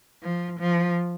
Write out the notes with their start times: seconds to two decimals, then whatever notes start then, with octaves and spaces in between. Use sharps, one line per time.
0.23 F3
0.60 F3